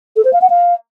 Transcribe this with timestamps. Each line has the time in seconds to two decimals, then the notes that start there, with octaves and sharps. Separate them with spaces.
0.16 A4
0.25 C5
0.33 F5
0.41 F#5
0.50 F5